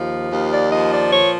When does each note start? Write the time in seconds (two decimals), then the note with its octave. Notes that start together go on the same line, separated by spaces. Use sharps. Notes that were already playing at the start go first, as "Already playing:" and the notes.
Already playing: D#2 F3
0.32 D#2
0.52 D5
0.71 F3 D#5
0.92 D5
1.10 A#2 C#5